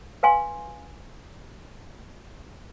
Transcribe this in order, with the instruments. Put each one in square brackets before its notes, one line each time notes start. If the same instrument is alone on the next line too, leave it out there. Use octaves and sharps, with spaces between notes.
[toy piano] B4 F5 G#5 C6